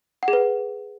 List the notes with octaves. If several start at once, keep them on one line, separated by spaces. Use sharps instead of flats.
F#5
G#4
B4